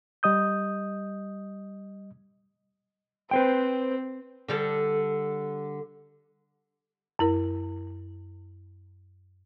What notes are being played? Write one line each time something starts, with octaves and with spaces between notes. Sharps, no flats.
G3 D#5 D#6 G6
C4 B4 C5 G5
D3 G3 A4
F#2 E4 A#4